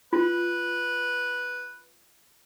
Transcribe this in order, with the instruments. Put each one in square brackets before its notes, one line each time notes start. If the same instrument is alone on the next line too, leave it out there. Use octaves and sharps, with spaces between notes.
[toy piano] F4 [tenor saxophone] B4